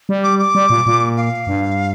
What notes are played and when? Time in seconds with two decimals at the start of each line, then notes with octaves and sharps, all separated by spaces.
0.09 G3
0.23 D6
0.39 D6
0.55 G3
0.70 A#2
0.86 A#2
1.17 F5
1.47 G2